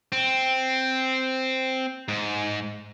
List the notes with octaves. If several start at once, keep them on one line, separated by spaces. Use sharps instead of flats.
C4
G#2